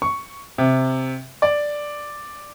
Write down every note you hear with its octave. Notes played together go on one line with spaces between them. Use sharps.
C#6
C3
D5